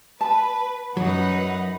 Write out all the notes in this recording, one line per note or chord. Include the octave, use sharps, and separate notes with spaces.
B4 A5
F#2 F#3 D#4 B4 F#5